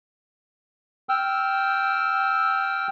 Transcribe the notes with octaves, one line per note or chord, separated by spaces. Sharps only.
G5 E6 F6